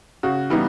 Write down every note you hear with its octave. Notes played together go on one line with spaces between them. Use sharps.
C#3 F#4
E3 G3 B3 D#4